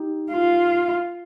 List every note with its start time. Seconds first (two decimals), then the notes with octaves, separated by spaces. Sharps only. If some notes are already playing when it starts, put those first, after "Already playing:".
Already playing: D#4 G4
0.32 F4